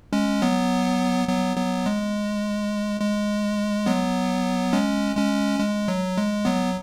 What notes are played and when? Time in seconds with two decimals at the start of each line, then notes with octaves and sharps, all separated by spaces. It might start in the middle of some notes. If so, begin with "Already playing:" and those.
0.13 G#3 C#4
0.42 F#3 B3
1.28 F#3 B3
1.56 F#3 B3
1.86 G#3
3.01 G#3
3.86 F#3 B3
4.73 G#3 C#4
5.16 G#3 C#4
5.59 G#3
5.88 F#3
6.17 G#3
6.45 F#3 B3